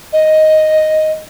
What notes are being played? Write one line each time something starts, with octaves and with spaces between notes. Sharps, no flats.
D#5